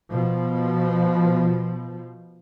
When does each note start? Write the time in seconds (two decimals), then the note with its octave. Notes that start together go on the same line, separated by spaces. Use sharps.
0.11 B2 F3